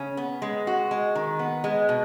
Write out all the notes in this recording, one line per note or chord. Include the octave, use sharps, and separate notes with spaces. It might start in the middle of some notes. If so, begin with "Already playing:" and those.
Already playing: C#3 C#4
B3
G#3
F#4
G#3
D#3
B3
G#3
B2